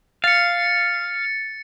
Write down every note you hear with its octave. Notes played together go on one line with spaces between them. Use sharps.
F5 A6 C#7